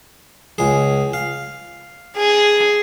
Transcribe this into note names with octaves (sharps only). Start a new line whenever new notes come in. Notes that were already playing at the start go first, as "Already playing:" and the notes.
C#2 G#4
F5
G#4